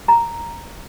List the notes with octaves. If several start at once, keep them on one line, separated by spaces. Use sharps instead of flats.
A#5